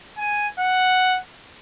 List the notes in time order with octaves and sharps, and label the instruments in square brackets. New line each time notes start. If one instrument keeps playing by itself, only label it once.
[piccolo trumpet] G#5
F#5